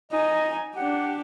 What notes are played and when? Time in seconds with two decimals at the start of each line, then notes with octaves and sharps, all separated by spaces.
0.12 D#4 D#5 G#5
0.75 D4 G4 F#5